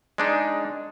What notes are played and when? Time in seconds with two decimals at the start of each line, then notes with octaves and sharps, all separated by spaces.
0.18 G#3 D4 D#4